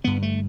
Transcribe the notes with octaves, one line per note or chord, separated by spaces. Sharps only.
G2 D3 B3
A3